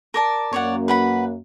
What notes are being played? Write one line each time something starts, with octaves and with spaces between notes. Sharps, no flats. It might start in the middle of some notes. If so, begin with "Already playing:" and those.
A#4 D5 A5
F#2 A#3 C#5 D5 F#5
B4 F#5 B5